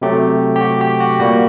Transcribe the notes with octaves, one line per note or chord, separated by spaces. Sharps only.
C3 F#3 A3 G4
G4
F#4
G4
F#4
A#2 G3 A#3 F#4